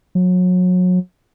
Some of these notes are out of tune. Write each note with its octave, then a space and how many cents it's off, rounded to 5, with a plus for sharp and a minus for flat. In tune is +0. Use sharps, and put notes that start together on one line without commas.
F#3 -30